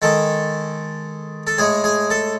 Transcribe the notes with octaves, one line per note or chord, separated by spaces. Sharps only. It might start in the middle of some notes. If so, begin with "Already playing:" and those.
D#3 G#3 A4
A4
A2 G#3 G#4
G#4
A4